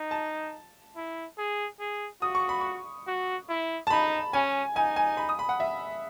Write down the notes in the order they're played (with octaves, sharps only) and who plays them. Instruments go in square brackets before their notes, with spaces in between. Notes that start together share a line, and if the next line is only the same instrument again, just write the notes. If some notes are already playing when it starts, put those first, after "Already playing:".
Already playing: [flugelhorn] D#4
[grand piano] A5
[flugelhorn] E4
G#4
G#4
[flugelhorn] F#4 [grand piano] D#6
[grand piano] C#6
B5
C#6
[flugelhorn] F#4
E4
[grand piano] A5
[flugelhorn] D#4 [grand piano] B5
[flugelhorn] C#4 [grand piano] G#5
[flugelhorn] D#4 [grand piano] G#5
[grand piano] G#5
B5
D#6
B5
F#5
E5